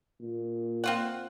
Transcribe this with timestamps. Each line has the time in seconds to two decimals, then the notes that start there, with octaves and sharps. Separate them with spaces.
0.21 A#2
0.84 C4 F4 F#5